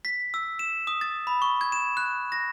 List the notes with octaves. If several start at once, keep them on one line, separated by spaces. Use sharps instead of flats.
B6
E6
E7
D#6
A6
B5
C#6
G#6
E7
F#6
A#6